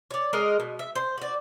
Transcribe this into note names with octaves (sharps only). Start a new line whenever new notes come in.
C#5 D5
G#3 A#4 D#5
B2
E5
C5
F#4 D5